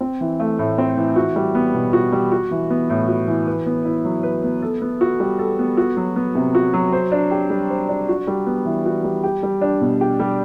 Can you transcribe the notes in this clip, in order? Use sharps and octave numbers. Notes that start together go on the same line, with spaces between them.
C4
E3
A3
A2
C4
E3
F#4
G3
B3
B2
F#4
G3
F#4
E3
B3
A2
F#4
E3
B4
B3
E4
F#3
B4
B3
A4
B3
F#4
G3
A4
B3
F#4
F#3
B3
C3
F#4
F#3
C5
D4
G4
G3
C5
D4
F#4
G3
B3
E3
F#4
G3
G4
G3
D4
B2
G4
G3